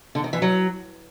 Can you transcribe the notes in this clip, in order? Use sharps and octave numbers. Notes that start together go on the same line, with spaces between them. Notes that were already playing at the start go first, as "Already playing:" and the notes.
D3
D#3
E3
F#3